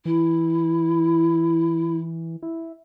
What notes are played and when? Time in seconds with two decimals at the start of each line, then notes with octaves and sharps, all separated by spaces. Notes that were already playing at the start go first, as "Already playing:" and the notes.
0.05 E3 E4
2.43 E4